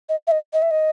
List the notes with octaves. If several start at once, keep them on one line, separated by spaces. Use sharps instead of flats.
D#5
E5
D#5
D#5
E5
D#5